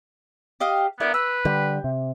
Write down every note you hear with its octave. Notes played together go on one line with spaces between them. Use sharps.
G4 D#5 F5
B3 D4 E4 A#4
B4 E6
D3 G3 G4
C3